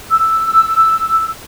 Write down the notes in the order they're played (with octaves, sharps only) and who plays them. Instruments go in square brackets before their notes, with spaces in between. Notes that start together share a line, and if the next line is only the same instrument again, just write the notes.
[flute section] E6